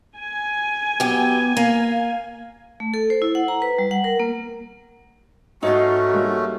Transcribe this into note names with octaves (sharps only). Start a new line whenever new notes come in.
G#5
F#2 B3 G4
A#3 F5
A3
A4
C5
E4
F#5
A#5
B4
G3
F#5
A#4
A#3
G#2 A3 C#4 D#4 F4 F#4 C#5 A#5
G3 G#3 A#3